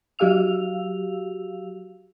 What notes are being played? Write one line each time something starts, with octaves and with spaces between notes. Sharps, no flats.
F#3 F#4 G4 F5 E6 F7